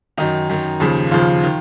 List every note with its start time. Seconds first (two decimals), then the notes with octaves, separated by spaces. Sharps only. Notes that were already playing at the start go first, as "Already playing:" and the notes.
0.17 F#2 D#3 D#4
0.49 F#2 D#3
0.80 D#2 C#3 F3
1.11 D#2 C#3 F3 F4
1.43 D#3